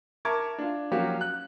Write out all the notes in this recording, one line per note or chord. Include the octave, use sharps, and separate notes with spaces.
A#4 E5 A5 C#6 D6 G#6
D4 F4
F3 F#3 A#3 C#4 F#4 G4
F#6